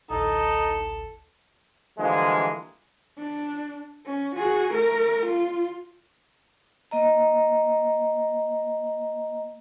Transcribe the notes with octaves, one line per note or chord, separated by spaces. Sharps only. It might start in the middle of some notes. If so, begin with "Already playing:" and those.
A1 D2 D#4 A4
D3 E3 F3 G3 G#3 A#3
D4
C#4
F#4 G#4
A3 A#4
F4
A#3 D#5 A#5